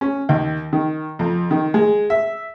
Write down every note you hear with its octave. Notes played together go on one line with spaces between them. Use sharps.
C#4
D#2
D#3
F2
D#3
G#3
E5